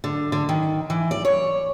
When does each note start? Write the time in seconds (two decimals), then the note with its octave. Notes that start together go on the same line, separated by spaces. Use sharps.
0.04 D3
0.32 D3
0.49 D#3
0.90 E3
1.11 D5
1.25 C#5